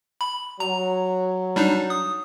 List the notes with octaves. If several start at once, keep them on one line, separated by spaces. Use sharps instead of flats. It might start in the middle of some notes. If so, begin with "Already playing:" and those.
B5
F#3 A#5
G3 D4 D#4
D#6